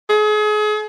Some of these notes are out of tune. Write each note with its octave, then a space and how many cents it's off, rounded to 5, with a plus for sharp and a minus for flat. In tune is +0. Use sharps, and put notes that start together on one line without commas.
G#4 +35